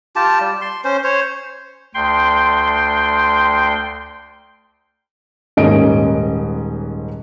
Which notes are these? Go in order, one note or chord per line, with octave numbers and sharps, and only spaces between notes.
F4 G4 A5
G3
C6
C#4 C5
C5 C#5
D2 G5 C6
D#1 G#2 A#3 C#4 D#5 D7